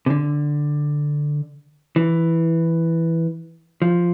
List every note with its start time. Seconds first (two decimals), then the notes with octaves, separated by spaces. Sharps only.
0.06 C3
0.10 D3
1.96 E3
3.82 F3